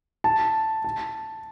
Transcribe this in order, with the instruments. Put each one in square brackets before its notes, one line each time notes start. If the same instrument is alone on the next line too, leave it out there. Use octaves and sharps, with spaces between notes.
[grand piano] A5
A5